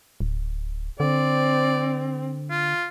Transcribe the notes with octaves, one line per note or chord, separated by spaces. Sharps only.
D1
D3 C4 D5
F4